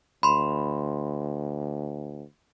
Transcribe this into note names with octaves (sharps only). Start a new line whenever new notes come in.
D2 B5 C6